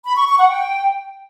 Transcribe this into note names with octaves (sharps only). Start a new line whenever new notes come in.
B5
C#6
C#6
F#5
G5